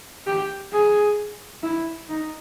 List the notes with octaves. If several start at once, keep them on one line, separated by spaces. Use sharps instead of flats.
G4
G#4
E4
D#4